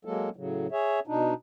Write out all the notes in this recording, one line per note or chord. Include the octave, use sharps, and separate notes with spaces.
F#3 G#3 A#3 A4
A2 C#3 F#3
G#4 C#5 E5
B2 D4 D#4